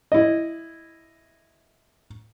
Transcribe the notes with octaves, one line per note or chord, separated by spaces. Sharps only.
E4 D#5